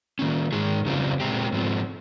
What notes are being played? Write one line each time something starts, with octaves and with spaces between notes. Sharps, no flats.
D#3 A#3 C#4
G#2 D#3 G#3 D#4 G#4
F2 C#3 G3 C4 F4
A#2 G#3 C4 G4
G#2 F3 G#3 C4